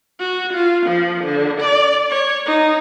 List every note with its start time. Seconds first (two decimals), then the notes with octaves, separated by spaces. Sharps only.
0.20 F#4
0.53 F4
0.86 F3
1.24 D3
1.60 D5
2.10 C#5
2.46 D#4